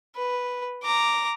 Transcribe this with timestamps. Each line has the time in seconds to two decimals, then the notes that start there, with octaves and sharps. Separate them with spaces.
0.16 B4
0.83 A#5 D6